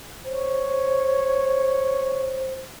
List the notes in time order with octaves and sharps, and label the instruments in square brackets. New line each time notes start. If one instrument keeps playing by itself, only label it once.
[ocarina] C5 [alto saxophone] C#5